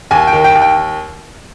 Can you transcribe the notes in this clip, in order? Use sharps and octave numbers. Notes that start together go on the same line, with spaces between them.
D#2 G#5
G5
D#3
G5
D#2
G5